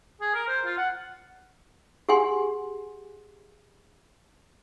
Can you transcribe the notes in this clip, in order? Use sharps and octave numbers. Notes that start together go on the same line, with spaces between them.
G#4
A#4
C5
F4
F#5
G4 G#4 F#5 G#5 C6